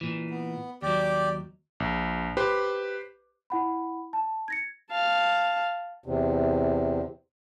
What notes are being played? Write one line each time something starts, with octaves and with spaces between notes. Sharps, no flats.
A#2 E3
B3
D#2 F#3 G4 D5
A#1
G4 B4 C5
E4 F#5 B5
A5
G#6 A#6 C#7
F5 A5
E2 C3